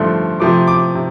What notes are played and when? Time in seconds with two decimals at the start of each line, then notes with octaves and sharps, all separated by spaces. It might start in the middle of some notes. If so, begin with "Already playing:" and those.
Already playing: G2 D3 F3 A3 C6
0.40 C3 F3 A3 D6
0.67 D6
0.95 C3